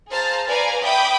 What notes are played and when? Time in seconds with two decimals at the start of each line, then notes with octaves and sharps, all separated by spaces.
0.11 G#4 C5 F5 A5 A#5
0.48 B4 D5 F5 G#5 A#5
0.83 E5 G5 B5 D6 D#6 G6